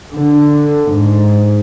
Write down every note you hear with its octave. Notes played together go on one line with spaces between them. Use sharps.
D3
G#2